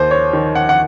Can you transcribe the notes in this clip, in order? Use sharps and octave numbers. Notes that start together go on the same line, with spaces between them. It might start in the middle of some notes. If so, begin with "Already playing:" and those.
Already playing: D#2 C5
C#5
D#3
F#5
F#5